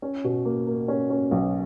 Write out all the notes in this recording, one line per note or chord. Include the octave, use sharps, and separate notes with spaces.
C#4
B2
A#3
A#3
C#4
C#4
B1